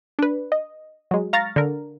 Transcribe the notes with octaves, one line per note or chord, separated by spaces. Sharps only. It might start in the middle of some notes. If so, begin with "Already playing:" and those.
D4 B4
D#5
F#3 G#3
F5 A#5 C#6 F6 A6 A#6
D3 A#4